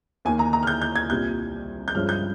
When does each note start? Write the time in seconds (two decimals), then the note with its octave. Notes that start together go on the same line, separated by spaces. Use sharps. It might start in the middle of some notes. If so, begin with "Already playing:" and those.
0.25 D#2 D#3 A#3 G#5
0.39 A#5
0.53 A#5
0.63 F6
0.67 G6
0.82 G6
0.95 G#6
1.10 C2 A#2 G3 G6
1.88 G6
1.95 G2 F3 G#3 C#4 F6
2.09 G6